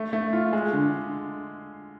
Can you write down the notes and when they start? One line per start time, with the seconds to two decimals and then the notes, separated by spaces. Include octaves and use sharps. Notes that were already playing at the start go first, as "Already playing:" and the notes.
Already playing: A3
0.13 A3
0.33 F4
0.53 G#3
0.73 D3